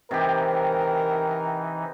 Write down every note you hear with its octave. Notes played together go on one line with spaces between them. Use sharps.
C3 E3 D#4 G4 A#4 G5